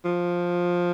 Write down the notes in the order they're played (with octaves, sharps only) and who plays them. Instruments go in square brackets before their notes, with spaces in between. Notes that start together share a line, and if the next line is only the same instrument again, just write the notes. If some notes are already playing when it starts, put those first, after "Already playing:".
[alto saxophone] F3